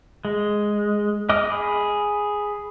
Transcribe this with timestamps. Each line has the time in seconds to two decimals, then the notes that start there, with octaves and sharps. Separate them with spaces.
0.25 G#3
1.29 D#5 D6 D#6 F6
1.50 G#4 B5